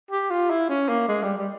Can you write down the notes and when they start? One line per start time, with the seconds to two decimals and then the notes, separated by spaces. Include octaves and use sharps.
0.11 G4
0.30 F4
0.50 E4
0.69 C#4
0.89 A#3
1.08 G#3
1.23 G3
1.37 G3